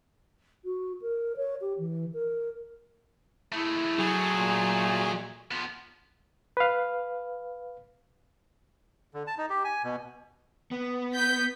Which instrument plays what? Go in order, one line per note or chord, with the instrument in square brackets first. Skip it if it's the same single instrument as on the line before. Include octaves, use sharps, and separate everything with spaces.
[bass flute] F#4
A#4
C#5
G4
E3
A#4
[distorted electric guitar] G#3 A3 [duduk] E4
[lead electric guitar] F#3 [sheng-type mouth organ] G#4
[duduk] A#2
[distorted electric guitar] F3 B3
[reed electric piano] B4 F5
[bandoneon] D3
A5
D#4
G4
G#5
B2
[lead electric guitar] B3
[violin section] G6 B6